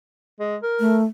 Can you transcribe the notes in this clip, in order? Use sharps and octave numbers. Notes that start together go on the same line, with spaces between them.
G#3
A#4
A3